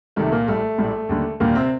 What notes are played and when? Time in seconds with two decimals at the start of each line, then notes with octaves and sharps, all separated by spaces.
0.16 C2 C3 D#3 G3 A3
0.32 A#2 A#3
0.48 A#1 A2 G3 A3
0.78 A#1 A2 G3
1.09 D#2 D3 G3
1.40 D#2 A#2 D3 G3 A#3
1.55 C3 C4